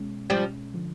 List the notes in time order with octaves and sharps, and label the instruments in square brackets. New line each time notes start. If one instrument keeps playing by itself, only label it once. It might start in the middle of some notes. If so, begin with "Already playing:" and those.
Already playing: [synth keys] B2 G#3 C#4
[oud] F3 G3
[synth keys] D3 F3